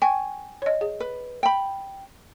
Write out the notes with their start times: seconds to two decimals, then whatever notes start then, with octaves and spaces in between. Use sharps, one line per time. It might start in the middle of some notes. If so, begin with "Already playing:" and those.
0.02 G5 G#5 C#6
0.62 C#5 D#5
0.81 G#4
1.00 B4
1.43 G5 B5